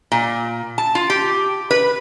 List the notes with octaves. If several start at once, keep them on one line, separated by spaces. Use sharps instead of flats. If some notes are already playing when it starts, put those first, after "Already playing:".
A#2
A5
F4
G4
B4